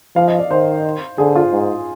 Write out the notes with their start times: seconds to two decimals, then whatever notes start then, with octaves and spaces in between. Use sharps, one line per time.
0.16 F3 F5
0.28 D#5
0.39 D5
0.50 D#3 C5
1.18 D3 G#4
1.36 F4
1.52 G#2